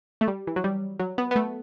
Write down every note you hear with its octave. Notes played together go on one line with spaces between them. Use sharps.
A3
G3
E3
F#3
G3
F#3
B3
B3
A3